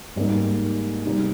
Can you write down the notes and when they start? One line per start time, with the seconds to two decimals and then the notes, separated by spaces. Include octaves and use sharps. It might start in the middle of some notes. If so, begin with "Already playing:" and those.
0.16 G#2 G3 A#3 D#4
1.05 C3 G3 C4 D#4